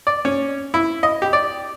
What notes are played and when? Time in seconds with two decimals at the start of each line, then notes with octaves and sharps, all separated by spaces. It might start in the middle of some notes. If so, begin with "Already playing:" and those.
0.07 D5
0.25 C#4
0.74 E4
1.03 D#5
1.22 G4
1.33 D5